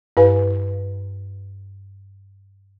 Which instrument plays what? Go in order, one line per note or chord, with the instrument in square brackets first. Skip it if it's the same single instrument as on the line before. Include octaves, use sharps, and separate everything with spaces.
[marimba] G2 E4 B4 F5 G#5